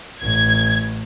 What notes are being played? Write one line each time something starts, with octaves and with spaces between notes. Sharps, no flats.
A1 G#6